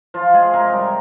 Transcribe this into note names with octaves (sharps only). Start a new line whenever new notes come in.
F3 F4
G#3 G#4
C3 A#4
G3